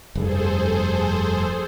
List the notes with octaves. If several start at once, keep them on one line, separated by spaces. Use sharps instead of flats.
F1 G2 G#4 A4 C5